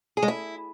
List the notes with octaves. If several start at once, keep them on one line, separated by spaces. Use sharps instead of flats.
G#4
G#3
E4